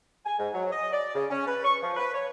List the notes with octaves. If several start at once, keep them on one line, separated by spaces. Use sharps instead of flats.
G#5
G#2
F#3
D#5
D5
C#3
C#4
B4
C#6
F3
B4
C#5